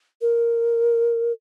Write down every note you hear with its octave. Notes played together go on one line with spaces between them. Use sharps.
A#4